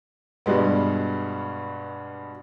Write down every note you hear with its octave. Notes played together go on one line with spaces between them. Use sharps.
G2 B2 G3 G#3 B3